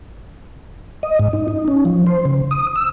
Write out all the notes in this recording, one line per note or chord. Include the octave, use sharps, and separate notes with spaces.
D#5
G#2
D#4
D#4
C#4
F3
C5
C#3
D#6
E6